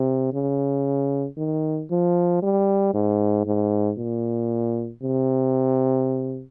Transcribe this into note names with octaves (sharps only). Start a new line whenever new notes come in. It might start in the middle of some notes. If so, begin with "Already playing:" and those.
Already playing: C3
C#3
D#3
F3
G3
G#2
G#2
A#2
C3